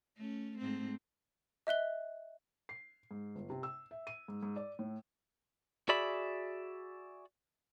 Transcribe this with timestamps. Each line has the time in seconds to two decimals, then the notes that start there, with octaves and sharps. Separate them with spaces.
0.17 A3 C#4
0.58 G#2 A3 C4
1.67 D#5 E5 F#6 G7
2.69 C7
3.11 G#2
3.36 G1
3.50 C3
3.63 E6
3.91 E5
4.07 D#7
4.28 G#2
4.43 G#2
4.56 D5
4.79 A2
5.89 F#4 G#4 D5 E5 B5